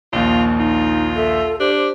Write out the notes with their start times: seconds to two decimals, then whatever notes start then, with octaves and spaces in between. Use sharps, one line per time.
0.13 A#1 D#2 F4
0.58 D#4 F4
1.16 A4 E5
1.60 D4 G4 C5
1.76 C5